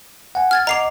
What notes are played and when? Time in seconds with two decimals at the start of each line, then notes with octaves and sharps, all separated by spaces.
0.35 F#5 G#5
0.51 F6 G#6 A6
0.67 D#5 F#5 A#5 D6 C7 F7